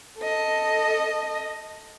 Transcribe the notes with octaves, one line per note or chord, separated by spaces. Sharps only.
A4 D#5